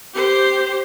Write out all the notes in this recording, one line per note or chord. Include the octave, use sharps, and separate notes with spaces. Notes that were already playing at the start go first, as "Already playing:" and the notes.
G4 C5